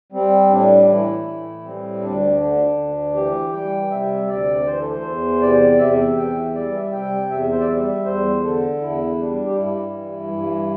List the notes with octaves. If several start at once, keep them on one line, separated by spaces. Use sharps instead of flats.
G3 C4
A2 D4
E3 E4
A2
G3 C4
D2 D4
D3 D4
D2
E3 G4
G3 G5
C3 E5
D2 D5
E3 C5
A4
C5
E2
C3 D5
E2 E5
E3 G5
E5
G3 D5
E5
C3 G5
E2 E5
C5
D5
G3 E5
E2 C5
D3 A4
E2 E4
G3 D4
G4
G2 E4
E3
G2